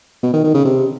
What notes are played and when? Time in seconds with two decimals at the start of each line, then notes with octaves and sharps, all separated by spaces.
0.23 B2
0.33 D#3
0.44 D#3
0.54 C#3
0.65 C3